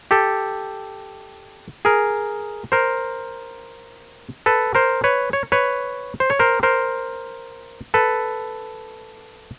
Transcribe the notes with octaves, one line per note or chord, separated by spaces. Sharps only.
G4 A4
G#4 A#4
A#4 C5
A4 B4
A#4 C5
B4 C#5
C#5
B4 C#5
C5
C#5
A#4 C5
A#4 C5
A4 B4